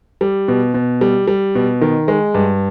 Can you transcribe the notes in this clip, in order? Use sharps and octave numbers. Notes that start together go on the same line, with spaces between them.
G3
B2
B2
G3
G3
B2
D#3
G#3
G2